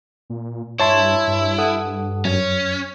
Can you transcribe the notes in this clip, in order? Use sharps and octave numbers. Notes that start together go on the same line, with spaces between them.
A#2
G2 E4 C#5 A5 C6
G2
A4 F#5 D#6
F#2 C#4